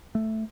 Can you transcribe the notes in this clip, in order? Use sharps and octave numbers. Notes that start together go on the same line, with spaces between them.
A3